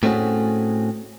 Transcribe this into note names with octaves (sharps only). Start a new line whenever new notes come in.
A2 A3 C4 C#4 F#4 G#4